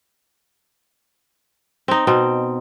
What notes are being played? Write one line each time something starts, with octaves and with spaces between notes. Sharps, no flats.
C4 D#4
B2 C4